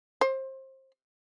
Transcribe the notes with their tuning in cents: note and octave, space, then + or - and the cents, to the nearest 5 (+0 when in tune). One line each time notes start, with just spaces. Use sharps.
C5 +25